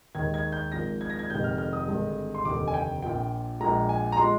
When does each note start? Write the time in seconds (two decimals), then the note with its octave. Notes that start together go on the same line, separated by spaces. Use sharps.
0.15 D#2 D#3 G#3 G#6
0.34 G#6
0.52 G6
0.72 G#1 G#2 F3 A#3 A#6
1.01 G#6
1.10 A#6
1.19 G#6
1.30 F1 F2 D#3 G#3 G6
1.44 F6
1.58 F6
1.73 D#6
1.88 G#1 G2 D3 G#3
2.35 C6
2.45 F1 D#2 D3 D6
2.68 G#5
2.74 G5
3.02 A#1 A#2 F3 G5
3.60 A#1 A#2 G#3 A#5
3.89 G#5
4.12 A#5
4.17 F3 G#3 C6